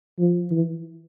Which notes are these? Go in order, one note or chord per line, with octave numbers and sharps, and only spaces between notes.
F3
E3